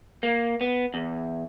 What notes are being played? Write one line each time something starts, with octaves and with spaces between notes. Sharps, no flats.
A#3
B3
E2